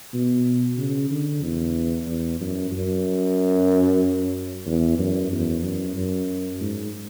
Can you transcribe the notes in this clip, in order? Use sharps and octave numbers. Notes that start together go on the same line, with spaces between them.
B2
C#3
D3
E2
E2
F#2
F#2
E2
F#2
E2
F#2
F#2
G#2